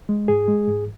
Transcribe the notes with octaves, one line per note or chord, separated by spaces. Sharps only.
G#3
G#2 G#4
G#3
G#2